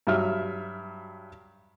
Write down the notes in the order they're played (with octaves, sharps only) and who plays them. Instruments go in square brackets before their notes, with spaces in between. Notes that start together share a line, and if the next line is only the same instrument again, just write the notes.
[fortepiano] G2 F#3 E5 F6